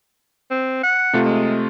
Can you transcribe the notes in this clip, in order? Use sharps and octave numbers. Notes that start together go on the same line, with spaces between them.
C4
F#5
C3 A3 F4
G#3